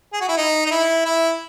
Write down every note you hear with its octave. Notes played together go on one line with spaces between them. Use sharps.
G#4
F#4
E4
D#4
D#4
E4
E4